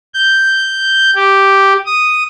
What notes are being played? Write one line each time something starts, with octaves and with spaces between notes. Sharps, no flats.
G6
G4
D#6